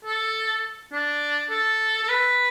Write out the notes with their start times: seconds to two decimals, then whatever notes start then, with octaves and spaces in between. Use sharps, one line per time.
0.05 A4
0.92 D4
1.50 A4
2.03 A4
2.08 B4